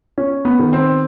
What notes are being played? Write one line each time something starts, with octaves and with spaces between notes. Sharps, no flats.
C#4
B3
D#3
C4